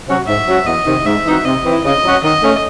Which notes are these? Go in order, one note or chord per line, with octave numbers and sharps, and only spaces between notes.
C3 F#3 C#4 F#4
G#2 E5
F#3 C#4 F#4
E2 D#5
C3 D#3
G#2 E5
E3 C4 D#4 F#4
C3 D#5
E3 C4 E4
C#3 D#5
F#3 C#4 F#4
D#3 D#5
A3 C#4